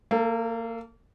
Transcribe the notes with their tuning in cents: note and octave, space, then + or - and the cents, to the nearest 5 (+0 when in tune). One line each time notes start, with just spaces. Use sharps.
A#3 -25 A4 +15